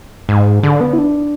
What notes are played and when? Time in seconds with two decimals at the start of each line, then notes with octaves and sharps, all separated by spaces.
0.29 G#2
0.63 D3
0.81 B3
0.93 E4
0.98 D4